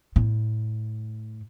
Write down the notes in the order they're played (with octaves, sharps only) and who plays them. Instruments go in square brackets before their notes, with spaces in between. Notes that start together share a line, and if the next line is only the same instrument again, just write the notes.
[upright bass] A2